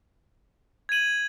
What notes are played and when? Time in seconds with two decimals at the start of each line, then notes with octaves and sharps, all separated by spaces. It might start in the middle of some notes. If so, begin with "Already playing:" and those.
0.89 G#6 D#7 F#7